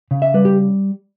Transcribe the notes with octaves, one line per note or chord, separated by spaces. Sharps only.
C#3
E5
G3 B4
G4